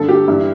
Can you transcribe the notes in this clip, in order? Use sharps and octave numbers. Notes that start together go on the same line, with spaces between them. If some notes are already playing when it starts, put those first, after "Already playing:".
Already playing: G2 D3 A4
G4
G2 E3